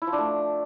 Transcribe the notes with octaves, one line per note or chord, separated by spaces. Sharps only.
E4
F3
D4
A3